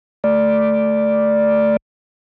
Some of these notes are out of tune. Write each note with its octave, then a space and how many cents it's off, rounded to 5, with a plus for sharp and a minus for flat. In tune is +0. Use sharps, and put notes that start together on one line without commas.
A3 +0 D5 +0